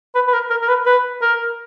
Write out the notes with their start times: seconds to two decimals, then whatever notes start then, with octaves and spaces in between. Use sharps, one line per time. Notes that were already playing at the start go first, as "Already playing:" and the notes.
0.15 B4
0.27 B4
0.33 A#4
0.50 A#4
0.61 A#4
0.68 B4
0.86 B4
1.22 A#4